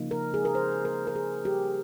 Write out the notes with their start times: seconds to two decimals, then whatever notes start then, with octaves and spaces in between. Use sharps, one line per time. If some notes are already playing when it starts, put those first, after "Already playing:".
Already playing: C#3 F3 A#3 D#4
0.11 A#4
0.34 G#4
0.45 A#4
0.55 C5
0.85 A#4
1.07 A#4
1.15 G#4
1.45 G4